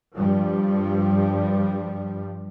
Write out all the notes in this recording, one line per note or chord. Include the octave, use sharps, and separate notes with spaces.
G2 F3 G3